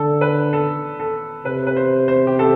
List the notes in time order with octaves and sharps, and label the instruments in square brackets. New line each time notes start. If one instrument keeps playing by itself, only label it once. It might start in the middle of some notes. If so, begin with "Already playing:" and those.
Already playing: [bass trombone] D3 [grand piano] A4
[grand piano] B4
A4
A4
[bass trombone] C3 [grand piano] B4
[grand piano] B4
C5
C5
G4
A4